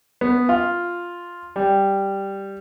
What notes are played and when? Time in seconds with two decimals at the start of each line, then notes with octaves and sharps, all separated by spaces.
0.21 B3
0.49 F4
1.56 G3